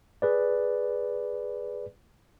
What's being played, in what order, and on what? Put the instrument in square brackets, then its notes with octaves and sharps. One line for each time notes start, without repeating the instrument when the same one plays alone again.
[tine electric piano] G#4 B4 D5